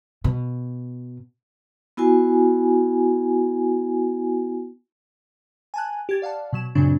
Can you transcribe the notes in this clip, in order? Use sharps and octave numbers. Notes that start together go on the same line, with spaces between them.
B2
B3 E4 F#4 G#5
G#5 A5 F#6
G4 G#6 A6
D5 F5 F#5 A5
B2 F#3 E7
F#2 A#2 C#3 F#3 C4 D4